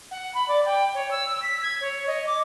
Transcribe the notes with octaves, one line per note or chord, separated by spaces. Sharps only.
F#5
B5
D5
G5
C#5
E6
B6
G#6
C#5
D#5
D6